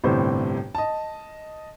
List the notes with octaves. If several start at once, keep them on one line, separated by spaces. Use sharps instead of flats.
G1 A2 C3 G3 C5
D#5 A5